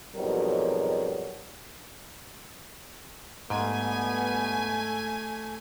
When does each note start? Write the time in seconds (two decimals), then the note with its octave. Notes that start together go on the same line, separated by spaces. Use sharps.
0.15 F2 G#2 B2 F#3 G3 A#4
3.50 G#2 G3 A3 B3 G#5